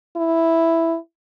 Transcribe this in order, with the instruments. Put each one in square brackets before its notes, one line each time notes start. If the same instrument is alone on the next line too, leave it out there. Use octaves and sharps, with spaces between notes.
[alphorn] E4